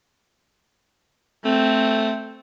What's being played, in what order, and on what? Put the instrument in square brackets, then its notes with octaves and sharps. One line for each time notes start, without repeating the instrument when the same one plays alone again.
[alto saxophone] A3 [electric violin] C4